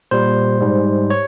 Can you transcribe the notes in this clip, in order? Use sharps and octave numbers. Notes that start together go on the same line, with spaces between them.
A#2 G3 C5
G#2 G3
C#5